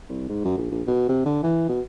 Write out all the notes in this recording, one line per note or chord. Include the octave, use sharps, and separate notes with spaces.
C2
G#2
F#2
A#1
A#1
B2
C3
D3
E3
B2